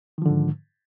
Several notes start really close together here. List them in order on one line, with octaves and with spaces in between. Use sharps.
D#3 F3 D3 G#2